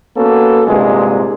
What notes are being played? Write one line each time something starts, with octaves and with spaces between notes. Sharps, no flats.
A#3 B3 C#4 F#4 A4
C2 G2 A#2 G#3